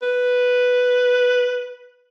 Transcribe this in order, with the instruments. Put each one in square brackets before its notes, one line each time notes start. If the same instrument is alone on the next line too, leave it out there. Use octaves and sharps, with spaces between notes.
[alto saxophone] B4